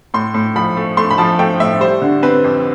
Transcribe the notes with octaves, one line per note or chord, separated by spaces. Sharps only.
A2 C6
A2
F3 B5
A3
A3 C6
B5
F3 A5
A3 G5
A2 E5
G3 C5
D3
C4 B4
F2